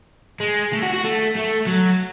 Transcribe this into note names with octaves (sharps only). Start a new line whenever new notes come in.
G#3
A3
F#4
F#4
A3
A3
F#3